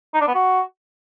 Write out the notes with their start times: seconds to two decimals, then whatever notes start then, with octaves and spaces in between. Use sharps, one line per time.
0.14 D#4
0.21 D4
0.28 B3
0.35 F#4